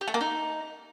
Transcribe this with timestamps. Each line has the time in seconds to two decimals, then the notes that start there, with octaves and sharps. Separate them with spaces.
0.01 G4
0.08 A3
0.14 A#3
0.21 D#4